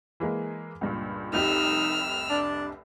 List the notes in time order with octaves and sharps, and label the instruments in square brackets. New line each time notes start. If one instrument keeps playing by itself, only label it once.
[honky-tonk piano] E3 G#3 A#3
C#2 G2 A#2
[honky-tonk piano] F1 C2 G4 [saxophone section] D#4 [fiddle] E6 F6
[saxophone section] D4